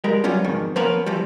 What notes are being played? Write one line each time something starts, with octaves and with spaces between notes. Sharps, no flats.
G3 G#3 A#4
F#3 G3 B3 C#4 F4
F2 G#2 B2 D#3
F3 A#3 B3 C#4 A#4 B4
E3 F3 G3